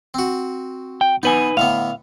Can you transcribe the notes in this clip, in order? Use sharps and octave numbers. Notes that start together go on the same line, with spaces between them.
C4 F#4
G5
B3 D#4 B4 G#5
A2 D3 B3 F5